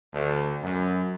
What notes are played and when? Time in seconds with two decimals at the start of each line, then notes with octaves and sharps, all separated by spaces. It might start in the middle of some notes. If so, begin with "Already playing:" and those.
0.14 D2
0.63 F#2